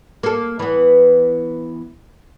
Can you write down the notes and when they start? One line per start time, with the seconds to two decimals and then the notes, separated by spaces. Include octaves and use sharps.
0.23 A#3 A4
0.59 E3 B3